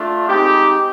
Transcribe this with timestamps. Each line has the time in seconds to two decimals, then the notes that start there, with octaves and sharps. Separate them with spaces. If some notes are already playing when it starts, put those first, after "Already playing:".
Already playing: A3 D4 F4
0.27 G#3 C4 D#4 G4